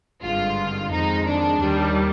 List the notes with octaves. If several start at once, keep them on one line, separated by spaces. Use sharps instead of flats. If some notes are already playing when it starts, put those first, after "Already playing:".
G#1 G2 D3 G#3 F4
F2 D#3 G#3 D#4
D4
D#2 D#3 G3